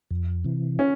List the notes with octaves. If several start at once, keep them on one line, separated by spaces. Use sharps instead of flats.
F2
C3 E3
C#4